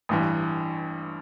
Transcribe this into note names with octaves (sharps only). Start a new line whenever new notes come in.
A1 G2 E3